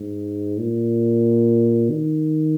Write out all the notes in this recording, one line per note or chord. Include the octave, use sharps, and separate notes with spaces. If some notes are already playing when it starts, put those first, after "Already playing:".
Already playing: G#2
A#2
D#3